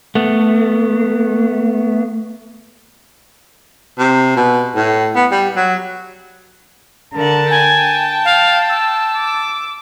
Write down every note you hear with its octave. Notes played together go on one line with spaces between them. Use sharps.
A3 B3
C3
B2
A2
B3
G3
F#3
D3 A#4 F#5 A5
G5 G#5
F5
E6
D6